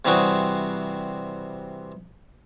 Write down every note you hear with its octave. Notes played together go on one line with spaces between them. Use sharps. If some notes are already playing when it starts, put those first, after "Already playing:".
C3 E3 G3 C4 F#4 G#4